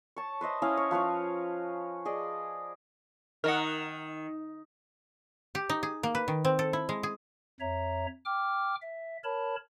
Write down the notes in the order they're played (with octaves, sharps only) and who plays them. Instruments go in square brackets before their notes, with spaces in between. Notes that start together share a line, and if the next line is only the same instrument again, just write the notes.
[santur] C#5 A5
B4 C5 D#5 E5
C#4 E4 D#5 F5
C#5
F3 B4 C#5 F5
G#4 D5 D#5
[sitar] D#3 [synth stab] A#4 D#5 F#5
[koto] G4
D#4
G#4
A#3
B4
D#3
C4
A4
E4
G#3
G#4
[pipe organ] F2 C#5 E5 A#5
G5 D6 F6
E5
A#4 C#5 A5 B5